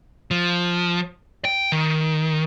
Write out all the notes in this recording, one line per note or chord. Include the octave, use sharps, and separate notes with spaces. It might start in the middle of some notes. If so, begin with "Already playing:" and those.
F3
G5
D#3